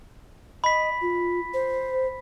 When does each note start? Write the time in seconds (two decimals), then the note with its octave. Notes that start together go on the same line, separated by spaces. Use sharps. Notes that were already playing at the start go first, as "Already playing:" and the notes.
0.64 D#5 B5 B6
1.01 F4
1.54 C5